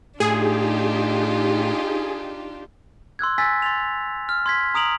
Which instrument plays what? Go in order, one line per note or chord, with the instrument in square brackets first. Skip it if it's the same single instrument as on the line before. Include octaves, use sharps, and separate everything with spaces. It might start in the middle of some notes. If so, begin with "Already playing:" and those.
[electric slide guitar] A2 [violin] D4 F4 [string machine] D#4 G4 [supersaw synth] G#4
[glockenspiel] C6 E6 F#6 G#6
G#5 E6 A6 B6
C6 A6 F7
F6
C6 G#6 B6
A#5 D#6 D7 F7 F#7